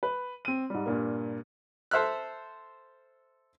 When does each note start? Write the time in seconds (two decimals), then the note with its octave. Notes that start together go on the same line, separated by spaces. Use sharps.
0.03 B4
0.45 C4 D#7
0.70 G#2 G3
0.86 G2 A#2 A#3
1.91 A4 C5 E5 F6 F#6